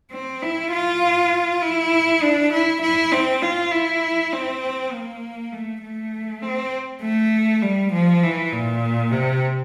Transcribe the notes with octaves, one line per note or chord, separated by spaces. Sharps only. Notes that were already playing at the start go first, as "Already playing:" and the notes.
C4
E4
F4
E4
D4
E4
E4
C4
F4
E4
C4
A#3
A3
A3
C4
A3
G3
F3
E3
A#2
C3